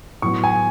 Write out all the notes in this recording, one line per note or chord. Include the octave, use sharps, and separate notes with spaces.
A2 F#3 B3 C#6
G#5